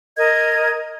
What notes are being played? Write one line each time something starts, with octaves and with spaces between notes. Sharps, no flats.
A#4 D#5 G#6